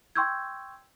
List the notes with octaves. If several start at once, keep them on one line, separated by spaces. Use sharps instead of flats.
G5 C6 C#6 E6 G6 G#6